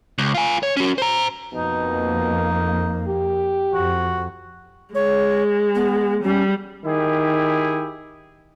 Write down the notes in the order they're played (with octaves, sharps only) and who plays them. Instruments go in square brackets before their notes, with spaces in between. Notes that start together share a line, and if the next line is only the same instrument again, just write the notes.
[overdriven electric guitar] C#2
F4 G#5
C#5
C#4 F#4
C5 A#5
[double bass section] F2 A#3 [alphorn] B2 [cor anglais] D#4
[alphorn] G4
[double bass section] F2 [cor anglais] F#4
[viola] G#3 [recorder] C#5
[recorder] B3
[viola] G3 [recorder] C#4
[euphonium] D#3 [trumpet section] E4 G4 G#4